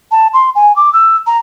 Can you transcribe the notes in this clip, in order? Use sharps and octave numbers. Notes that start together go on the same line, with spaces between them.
A5
C6
G#5
D6
E6
A#5